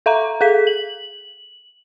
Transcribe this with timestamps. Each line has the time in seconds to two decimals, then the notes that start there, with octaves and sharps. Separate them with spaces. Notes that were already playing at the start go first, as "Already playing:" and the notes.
0.06 A4 E5 F5 A#5
0.41 G#4 A4 F5 B6
0.67 F#7